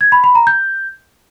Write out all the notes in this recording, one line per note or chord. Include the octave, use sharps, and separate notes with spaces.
G#6
B5
B5
A#5
G6